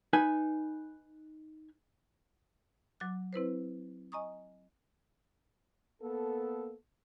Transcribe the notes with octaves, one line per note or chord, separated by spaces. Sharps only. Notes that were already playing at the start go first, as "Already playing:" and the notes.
D#4 B4 G#5
F#3 D6 F#6
C4 E4 B4 C5
D#5 G#5 A#5 C#6 D#6
A#3 B3 A4